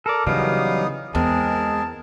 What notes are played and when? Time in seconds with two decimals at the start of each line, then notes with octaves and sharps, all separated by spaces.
0.06 A4 A#4 D5
0.27 C#3 E3 F#3 G3 B3 D#4 F5 D#6
1.15 E2 G#3 C4 G#4 A#4 A5